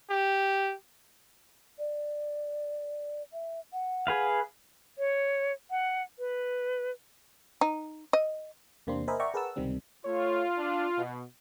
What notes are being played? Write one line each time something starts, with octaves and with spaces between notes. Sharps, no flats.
G4
D5
E5
F#5
G#4 B4 F5
C#5
F#5
B4
D#4
D#5
E2 C3 A#3 C4 D4 C6
A#4 C5 D#5 E5 G#5 B5
D5 E5 F#5 G5 A#5 C#6
G#4 A#4 B4 F#5 A5 E6
C#2 C3 D#3 G3 C4
A3 F4 C#5
D4
B2